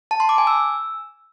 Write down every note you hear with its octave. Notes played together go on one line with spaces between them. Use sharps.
A5
C6
D6
G#5
E6